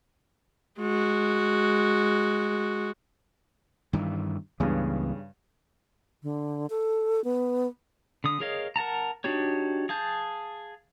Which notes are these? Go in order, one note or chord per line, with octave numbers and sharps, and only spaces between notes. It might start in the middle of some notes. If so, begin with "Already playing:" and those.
G#3 F#4
G2 D#3 E3
C#2 G2 C#3 E3 B3
D3
A4
B3
D3 D#6
G#4 A#4 C#5 D#5 F5
A#4 F#5 A5 A#5
D4 D#4 F#4 G4 C#5
G#4 F5 A5 G6